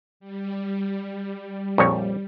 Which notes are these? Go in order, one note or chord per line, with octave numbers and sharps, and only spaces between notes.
G3
A#1 F2 C#5